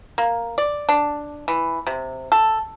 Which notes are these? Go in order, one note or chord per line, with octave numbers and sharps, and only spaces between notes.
A#3
D5
D4
E3
C3
A4